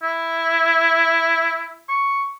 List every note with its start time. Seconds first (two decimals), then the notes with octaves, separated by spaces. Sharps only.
0.02 E4
1.88 C#6